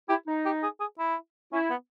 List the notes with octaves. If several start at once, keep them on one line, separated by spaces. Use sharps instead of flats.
E4 G4
D#4
G4
G#4
G#4
E4
C#4 E4
B3